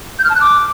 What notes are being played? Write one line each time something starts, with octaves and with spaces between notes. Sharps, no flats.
G6
F6
A5
F#6
D6